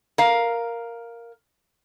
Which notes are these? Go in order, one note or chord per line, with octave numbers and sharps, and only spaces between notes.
A#4 F5